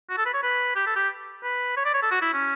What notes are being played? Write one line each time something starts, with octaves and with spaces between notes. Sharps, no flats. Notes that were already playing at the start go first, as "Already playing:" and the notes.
F#4
A4
B4
C#5
B4
G4
A4
G4
B4
C#5
D5
C#5
A4
F#4
E4
C#4